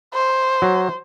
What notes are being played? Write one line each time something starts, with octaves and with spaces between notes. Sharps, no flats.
C5
F#3